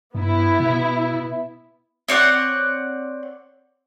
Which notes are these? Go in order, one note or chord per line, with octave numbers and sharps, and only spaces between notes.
G2 B3 E4
B2
C4 C#5 D5 F#5